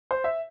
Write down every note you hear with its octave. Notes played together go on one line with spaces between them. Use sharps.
C5
E5